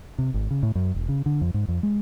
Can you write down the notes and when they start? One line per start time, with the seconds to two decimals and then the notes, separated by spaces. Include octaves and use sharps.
0.18 C3
0.34 G#1
0.51 C#3
0.63 A2
0.75 F#2
0.94 E1
1.09 C#3
1.26 D3
1.41 F2
1.54 G#2
1.68 F2
1.83 G#3